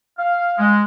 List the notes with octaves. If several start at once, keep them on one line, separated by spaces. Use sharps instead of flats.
F5
G#3